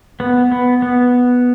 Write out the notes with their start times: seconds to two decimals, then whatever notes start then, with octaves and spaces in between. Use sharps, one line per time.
0.20 B3
0.52 B3
0.82 B3